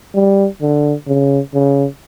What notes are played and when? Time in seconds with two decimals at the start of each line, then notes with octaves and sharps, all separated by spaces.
0.15 G3
0.62 D3
1.07 C#3
1.54 C#3